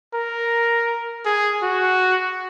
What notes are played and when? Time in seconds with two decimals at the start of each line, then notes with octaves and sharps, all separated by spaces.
0.14 A#4
1.26 G#4
1.63 F#4